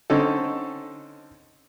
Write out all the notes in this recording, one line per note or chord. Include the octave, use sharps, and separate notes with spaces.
D3 C4 C#4 D#4 A4